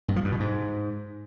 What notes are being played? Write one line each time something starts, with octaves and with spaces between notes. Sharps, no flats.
G2
F3
G2
B2
G#2